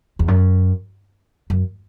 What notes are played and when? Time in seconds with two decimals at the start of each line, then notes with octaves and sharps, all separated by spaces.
0.19 E2
0.28 F#2
1.50 F#2